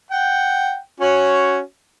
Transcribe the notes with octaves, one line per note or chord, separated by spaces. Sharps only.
F#5 G5
C#4 F#4 C#5